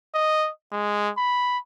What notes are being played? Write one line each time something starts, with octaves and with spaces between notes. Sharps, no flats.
D#5
G#3
B5